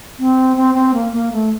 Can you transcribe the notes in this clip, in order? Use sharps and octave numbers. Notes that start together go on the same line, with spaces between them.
C4
C4
C4
A#3
A#3
A3